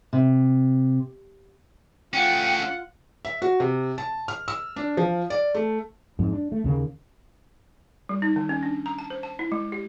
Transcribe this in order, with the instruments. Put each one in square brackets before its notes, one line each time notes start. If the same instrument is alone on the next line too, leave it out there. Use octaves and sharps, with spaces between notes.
[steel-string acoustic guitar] C3
[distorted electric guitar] A3 C#4 [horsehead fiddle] F4 F#5 [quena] G5
[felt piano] E5
F#4
C3
A5
F6
E6
D4
F3
D5
A3
[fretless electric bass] F2 G#2
D4
A3
D#2 C#3 A#3
[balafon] G3
D#4
D#3
C#4
D4
A#5
A5
C5
A5
E4
G#3
G4